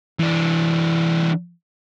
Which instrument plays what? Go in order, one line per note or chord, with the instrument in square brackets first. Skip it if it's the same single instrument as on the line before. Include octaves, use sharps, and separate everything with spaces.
[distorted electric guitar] E3 D4